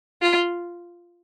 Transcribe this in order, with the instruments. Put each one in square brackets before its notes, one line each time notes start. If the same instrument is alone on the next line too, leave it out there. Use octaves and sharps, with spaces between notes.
[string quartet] F4